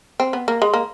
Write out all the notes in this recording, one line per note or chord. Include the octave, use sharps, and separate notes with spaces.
C4
B3
A#3
G#3
A#3